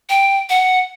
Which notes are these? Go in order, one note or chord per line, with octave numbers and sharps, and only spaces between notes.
G5
F#5